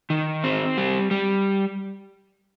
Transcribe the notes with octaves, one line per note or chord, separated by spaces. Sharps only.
D#3
C4
G3
G3